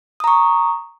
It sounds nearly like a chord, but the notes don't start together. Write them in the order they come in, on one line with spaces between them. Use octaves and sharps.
D#6 A#5 C#6